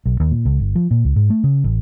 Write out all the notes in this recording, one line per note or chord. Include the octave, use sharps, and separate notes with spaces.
B1
D#2
A#2
C#2
G1
F3
A#2
C#2
G#2
A3
C#3
A1